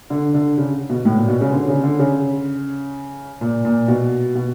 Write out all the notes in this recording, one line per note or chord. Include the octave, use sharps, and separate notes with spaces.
D3
D3
C#3
B2
A2
A#2
B2
C#3
D3
C#3
D3
C#3
A#2
A#2
B2
B2